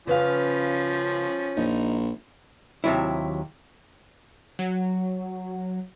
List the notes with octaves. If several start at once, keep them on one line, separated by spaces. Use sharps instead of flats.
C#3 F3 C#4 B4 F5
A#1 D#4
D#2 C3 F#3 E4
F#3